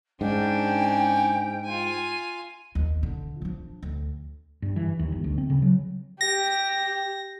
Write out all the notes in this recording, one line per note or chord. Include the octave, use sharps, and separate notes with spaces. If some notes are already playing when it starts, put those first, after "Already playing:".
G#2 C#4 D4 G5
F4 G#5
D#2
D3
F3 D4
D2
G2
E3
D#2
G1
D2
C4
C#3
F#3
G4 A#6